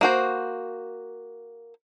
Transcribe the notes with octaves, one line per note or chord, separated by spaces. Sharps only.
A#3 F#4 C5